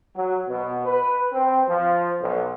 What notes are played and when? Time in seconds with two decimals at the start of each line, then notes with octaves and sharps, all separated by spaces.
0.15 F#3
0.48 B2
0.86 B4
1.32 C4
1.67 F3
2.21 B1